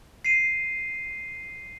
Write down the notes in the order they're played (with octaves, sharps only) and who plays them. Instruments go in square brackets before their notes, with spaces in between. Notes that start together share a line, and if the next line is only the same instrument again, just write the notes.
[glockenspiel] C7 D#7